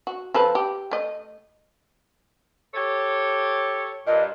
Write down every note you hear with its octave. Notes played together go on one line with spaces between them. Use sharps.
F#4
F3 A4 B4
G4
A3 D#5
G4 A4 C#5
G2 A#2 D#5